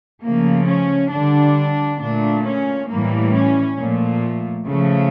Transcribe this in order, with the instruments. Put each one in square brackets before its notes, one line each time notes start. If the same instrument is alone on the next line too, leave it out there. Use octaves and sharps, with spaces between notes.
[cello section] C#3 F3 A3 A#3
C#4
D3 G3 D4
A#2 A3 D4
C#4
A2 E3 G3 A#3
C#4
A#2 F3 A3
C#3 F3 A3